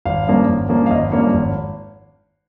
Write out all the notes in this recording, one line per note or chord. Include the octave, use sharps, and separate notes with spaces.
G#1 F5
G2 F3 A#3 C#4
G#1
G2 F3 A#3 C#4
F5
G#1 D#5
G2 F3 A#3 C#4 C#5
G#1